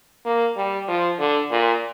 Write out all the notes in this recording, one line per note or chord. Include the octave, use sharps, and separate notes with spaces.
A#3
G3
F3
D3
A#2